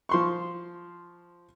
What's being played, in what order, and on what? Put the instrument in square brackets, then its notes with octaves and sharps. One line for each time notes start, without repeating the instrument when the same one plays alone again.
[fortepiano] F3 C6 C#6